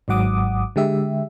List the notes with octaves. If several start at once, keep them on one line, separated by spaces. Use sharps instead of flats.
G#1 G#2 F#3 F#5 D6 D#6
D3 G#3 G4 E5